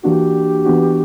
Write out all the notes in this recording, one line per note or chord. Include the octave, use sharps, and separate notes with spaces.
E3 A#3 D4 F#4 G4
E3 B3 D4 F#4